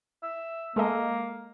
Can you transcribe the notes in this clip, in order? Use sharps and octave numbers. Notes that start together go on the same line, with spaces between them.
E5
G#3 A#3 A4 D#5